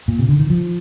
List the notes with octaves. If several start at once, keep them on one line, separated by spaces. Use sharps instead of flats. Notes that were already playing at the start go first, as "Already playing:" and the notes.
A#2
C3
D3
D#3
F3